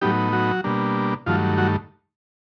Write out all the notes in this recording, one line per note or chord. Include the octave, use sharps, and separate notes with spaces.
A2 F#3 G3 B3 D#4 G4
F#3 F#4
B2 G3 A#3 D4
G2 D#3 F3 F#3 A3 F4
F#3 F#4